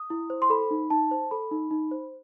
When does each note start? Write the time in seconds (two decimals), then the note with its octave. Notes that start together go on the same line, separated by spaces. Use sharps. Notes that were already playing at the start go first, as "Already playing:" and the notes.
Already playing: D#6
0.10 E4
0.30 C5
0.42 C6
0.50 A4 B5
0.71 D#4
0.90 D#4 A5
1.11 C5
1.31 A4 B5
1.51 D#4
1.71 D#4
1.91 C5